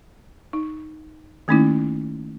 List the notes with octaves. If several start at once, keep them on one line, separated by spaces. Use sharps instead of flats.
D#4
D#3 A3 A#3 C#4 D#4 E4